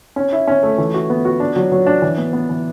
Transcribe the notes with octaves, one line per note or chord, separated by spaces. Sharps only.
C#4
E4
C#4
A3
E3
F#4
B3
F#4
D4
F#3
F#3
D4
E3
B3
B3
E3